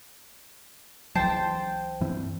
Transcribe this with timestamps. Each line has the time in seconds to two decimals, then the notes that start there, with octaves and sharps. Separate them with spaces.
1.15 C#2 E3 F#3 C5 G5 A5
2.01 G2 E3 C4